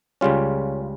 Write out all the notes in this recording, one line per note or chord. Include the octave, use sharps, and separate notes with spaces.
C#2 C#3 G3 C#4 F4